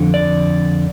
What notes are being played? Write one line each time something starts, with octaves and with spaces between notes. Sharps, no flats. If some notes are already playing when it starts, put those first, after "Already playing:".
Already playing: F2 D3
D5